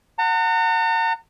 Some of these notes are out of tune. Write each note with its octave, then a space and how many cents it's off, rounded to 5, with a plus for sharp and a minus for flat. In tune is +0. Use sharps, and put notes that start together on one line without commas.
F#5 +0 A#5 -45